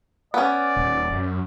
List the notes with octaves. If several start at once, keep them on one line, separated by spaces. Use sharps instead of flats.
B3 C#4 D5
D#1
F#2